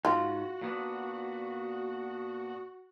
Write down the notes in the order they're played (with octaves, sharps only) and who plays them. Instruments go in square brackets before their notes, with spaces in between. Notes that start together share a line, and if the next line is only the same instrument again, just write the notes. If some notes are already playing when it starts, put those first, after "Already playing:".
[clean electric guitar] G#2 [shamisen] F4 [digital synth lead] F#4
[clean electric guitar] A#2 B3 D4